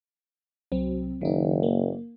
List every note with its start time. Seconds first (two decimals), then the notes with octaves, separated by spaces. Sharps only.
0.72 C2 F#3 C4
1.21 F#1 D#3 D#4
1.63 A#3